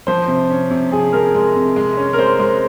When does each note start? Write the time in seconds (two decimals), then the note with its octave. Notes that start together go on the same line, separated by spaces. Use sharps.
0.07 F3 C5
0.28 C3
0.50 C#4
0.71 C3
0.92 F3 G#4
1.13 F3 A#4
1.35 G#3
1.56 C3
1.76 G#3
1.97 C#4
2.13 A#4
2.19 G#3 C5
2.39 G#3